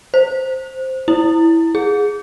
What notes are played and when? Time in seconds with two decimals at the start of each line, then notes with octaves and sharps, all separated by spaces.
0.14 C5
1.08 E4
1.75 G#4